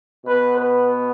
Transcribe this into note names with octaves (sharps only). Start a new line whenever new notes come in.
B2 B3 B4
B4